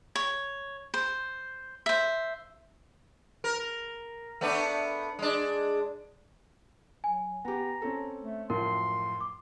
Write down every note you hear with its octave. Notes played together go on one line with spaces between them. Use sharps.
C#5
C5
C5 E5
A#4
A3 B3 D4
G#3 D4
F#3 G#5
B3 G4 A#5
C4 C#4 A4
A3
F#2 A2 F3 A#4 C6
D6